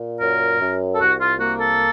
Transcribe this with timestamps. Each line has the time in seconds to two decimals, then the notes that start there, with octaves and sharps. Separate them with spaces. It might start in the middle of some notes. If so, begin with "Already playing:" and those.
Already playing: A#2
0.20 F#2 A#4
0.60 F#2
0.95 A4
0.99 C2 F#4
1.20 F4
1.39 A#3 F#4
1.60 A4